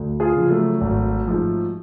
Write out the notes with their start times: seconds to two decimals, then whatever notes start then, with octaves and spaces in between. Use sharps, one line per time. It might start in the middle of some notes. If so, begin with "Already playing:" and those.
Already playing: D2
0.20 F4 G#4
0.36 C#3 F3
0.50 F#3 A3
0.81 G#1
1.27 G#2 F3